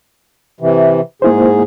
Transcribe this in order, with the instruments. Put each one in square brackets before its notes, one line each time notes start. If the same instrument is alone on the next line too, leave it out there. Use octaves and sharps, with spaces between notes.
[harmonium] C3 E3
[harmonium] G#2 G#4 [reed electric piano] A#3 E4 C5